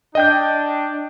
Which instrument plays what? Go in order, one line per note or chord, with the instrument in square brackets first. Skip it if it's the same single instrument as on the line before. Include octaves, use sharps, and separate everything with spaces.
[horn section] D4 [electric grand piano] D#5 G5 G6